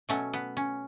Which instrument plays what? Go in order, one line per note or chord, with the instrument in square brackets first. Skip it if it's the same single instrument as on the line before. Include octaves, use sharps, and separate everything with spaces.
[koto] B2 F#3 A3 C#4
B3
C#4